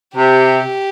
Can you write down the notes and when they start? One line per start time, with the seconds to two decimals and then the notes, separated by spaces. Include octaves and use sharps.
0.16 C3 G4